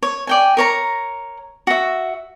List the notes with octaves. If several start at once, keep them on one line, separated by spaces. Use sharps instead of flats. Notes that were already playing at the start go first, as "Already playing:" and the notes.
C#5
D5 G5 G#5
A#4 C#5 A#5
F#4 E5